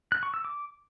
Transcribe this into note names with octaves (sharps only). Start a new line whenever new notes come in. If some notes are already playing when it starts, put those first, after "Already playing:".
F#6
C#6
E6
D6